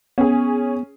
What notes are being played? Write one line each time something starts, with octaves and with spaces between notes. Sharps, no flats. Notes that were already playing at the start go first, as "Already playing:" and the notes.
B3 C#4 G#4